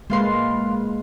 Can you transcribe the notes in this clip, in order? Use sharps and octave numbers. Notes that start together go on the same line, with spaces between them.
G#3 A#3 F4 B4 F5 C6